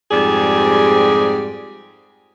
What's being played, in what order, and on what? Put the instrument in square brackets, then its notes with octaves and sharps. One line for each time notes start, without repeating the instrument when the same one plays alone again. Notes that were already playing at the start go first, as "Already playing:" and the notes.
[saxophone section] F2 G#2 G3 G4 G#4 D5